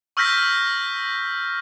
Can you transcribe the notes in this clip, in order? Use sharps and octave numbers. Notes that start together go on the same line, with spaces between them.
C#6 E6 F6 G6 A#6 B6